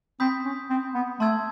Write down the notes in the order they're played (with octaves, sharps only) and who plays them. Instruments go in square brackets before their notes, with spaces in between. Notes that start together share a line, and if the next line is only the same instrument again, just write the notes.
[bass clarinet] C4 [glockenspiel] B5 D#6 G6 B6
[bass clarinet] C#4
C4
B3
[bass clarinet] A3 [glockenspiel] A5 C6 E6 G#6